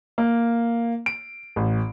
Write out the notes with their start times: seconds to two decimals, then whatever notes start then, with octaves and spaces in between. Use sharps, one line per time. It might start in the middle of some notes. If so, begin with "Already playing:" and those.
0.18 A#3
1.06 D7
1.56 A1